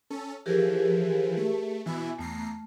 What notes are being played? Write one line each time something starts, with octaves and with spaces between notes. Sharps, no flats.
C#4 A4
E3 F3 G4 G#4 A#4
A3
B2 E3 E4 G#5
E2 A3 A#5 C7